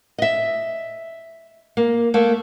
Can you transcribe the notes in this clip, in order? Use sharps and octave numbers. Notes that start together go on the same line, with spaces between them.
D#5 E5
A#3
A3 A#3